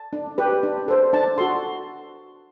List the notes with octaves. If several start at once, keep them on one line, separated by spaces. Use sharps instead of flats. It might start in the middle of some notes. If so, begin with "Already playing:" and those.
Already playing: A5
D4
G4 B4
D4
A4 C5
D4 A5
F#4 A4 C6